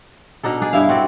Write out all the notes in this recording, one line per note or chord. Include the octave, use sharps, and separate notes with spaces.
B2 D4 D#4 A4
D4 G#4
G2 E4 E5 F5
C4 F#4 A4 D5